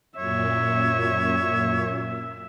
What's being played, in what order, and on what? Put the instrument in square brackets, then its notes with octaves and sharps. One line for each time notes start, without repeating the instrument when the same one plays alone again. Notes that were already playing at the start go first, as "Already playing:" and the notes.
[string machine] F#2 A#2 [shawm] C#5 [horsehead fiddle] E5